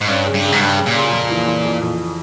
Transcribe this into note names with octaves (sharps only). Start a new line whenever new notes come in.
G#2
G2 C#4
C#3
G2
C#3
G#2
G2 G3
C#3
A#2
C#3
F2
E3
E3
F2
F2